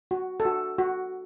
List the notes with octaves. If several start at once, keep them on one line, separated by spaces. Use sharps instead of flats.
F#4
A4
F#4
F#4